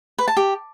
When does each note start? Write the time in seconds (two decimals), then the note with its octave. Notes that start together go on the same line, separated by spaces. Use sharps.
0.18 B4
0.28 A5
0.37 G4